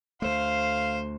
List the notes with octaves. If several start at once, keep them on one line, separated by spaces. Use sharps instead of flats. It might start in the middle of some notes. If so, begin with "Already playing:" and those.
D2 A3 C5 F5